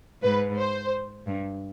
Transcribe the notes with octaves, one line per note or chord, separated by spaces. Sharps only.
G#2 B4
C5
G2